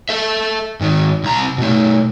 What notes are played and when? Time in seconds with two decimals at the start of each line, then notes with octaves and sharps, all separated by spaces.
0.09 A4 E5
0.80 G#2 D#3
1.23 C2 A#5
1.58 B2 A3